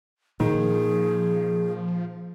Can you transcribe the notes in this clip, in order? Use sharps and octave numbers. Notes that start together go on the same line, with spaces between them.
A#2 D#3 F3 G#4